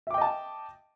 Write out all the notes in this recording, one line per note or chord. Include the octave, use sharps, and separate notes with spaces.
D#5 E5 G5 A5 D6